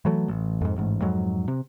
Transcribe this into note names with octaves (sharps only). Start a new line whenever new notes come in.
E3 F#3 A3
A1
F2 G#2
A1 G#2
F2 G#2 F#3
C3